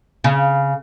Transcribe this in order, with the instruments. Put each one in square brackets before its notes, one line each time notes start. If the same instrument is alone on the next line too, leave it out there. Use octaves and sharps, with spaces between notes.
[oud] C#3